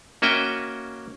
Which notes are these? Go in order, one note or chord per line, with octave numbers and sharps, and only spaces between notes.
A#3 C#4 F#4 D#5 E5 G5